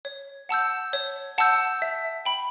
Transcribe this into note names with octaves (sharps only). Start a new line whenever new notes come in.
C#5
F#5 A5 E6 G6
C#5
F#5 A5 E6 G6
E5
G5 B5